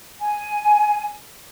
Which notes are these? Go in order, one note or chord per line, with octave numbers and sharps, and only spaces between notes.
G#5